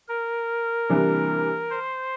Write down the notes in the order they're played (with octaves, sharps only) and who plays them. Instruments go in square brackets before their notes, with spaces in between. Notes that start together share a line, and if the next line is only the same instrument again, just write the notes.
[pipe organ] A#4
[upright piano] C3 E3 G3 A#3 D4
[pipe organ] C5